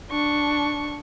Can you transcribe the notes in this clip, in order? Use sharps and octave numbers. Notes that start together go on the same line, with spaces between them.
D4 C#6